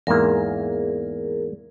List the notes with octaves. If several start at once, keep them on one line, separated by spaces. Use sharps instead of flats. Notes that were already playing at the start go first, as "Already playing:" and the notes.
E2 G#2 A#3 G#4 A#4